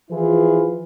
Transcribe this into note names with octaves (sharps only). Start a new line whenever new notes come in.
E3 F3 E4 F4 G#4 B4